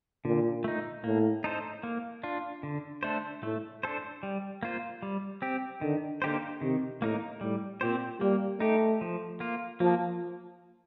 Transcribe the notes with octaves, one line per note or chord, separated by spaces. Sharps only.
A#2 D3
A3 D#4
A2 A#3
D#4 A4 C5
A#3
D4 F4
D3
A3 D4 A4 C5
A2 A3
D4 A4 C5
G3
A#3 F4 C5
G3
C4 G4
D3 D#3
D3 A#3 D#4 G4 C5
C3 D#3
A2 A#3 D#4 A#4
A2 G3
A#2 C4 G4 C5
G3 A#3
A3 D#4 G4
F3
A#3 F4
F3 A#3